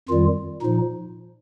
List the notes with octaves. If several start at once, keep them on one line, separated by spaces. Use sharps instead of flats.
F2 D#3 G3 F4
A#2 F3 D#4